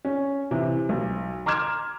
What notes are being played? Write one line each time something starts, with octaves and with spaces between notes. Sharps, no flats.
C#4
C3 E3
B1
A#5 C6 D6 F6 G#6 E7